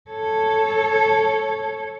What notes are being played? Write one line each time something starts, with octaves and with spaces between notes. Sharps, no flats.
A4 C#5